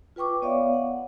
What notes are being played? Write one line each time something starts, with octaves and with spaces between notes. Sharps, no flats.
F4 B4 G5 C#6 D6
B3 C#5 D5 E5 F5
F#5